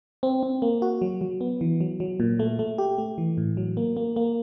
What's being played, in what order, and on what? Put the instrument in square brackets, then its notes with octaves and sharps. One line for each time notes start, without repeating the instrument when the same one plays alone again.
[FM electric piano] C4
C4
A#3
F#4
F#3
F#3
B3
E3
F#3
F#3
A#2
A3
A3
G4
A3
E3
A2
F#3
A#3
A#3
A#3